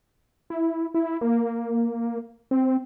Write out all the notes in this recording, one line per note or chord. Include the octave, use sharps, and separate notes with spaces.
E4
E4
A#3
C4